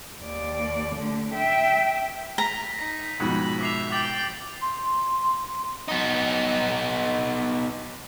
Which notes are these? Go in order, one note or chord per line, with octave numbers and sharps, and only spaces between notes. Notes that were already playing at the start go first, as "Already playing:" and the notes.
D#2 D5
D3 A3
E5 G5
A#5 A#6 B6
D#4 B6
F2 G#2 B2 B5
E5 D6 C7 F7
G5 D6 A6 F#7
C6
B3 D#4